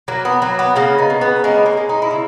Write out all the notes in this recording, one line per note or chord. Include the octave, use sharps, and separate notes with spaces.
F#3 A#3
B3
F#3 A#3
B3
C#3 A#3 C#4
B3 D#4
C#3
B3
G#3 A#3 C#4
B3
A#3 C#4
G#3
D#4
E4
C#3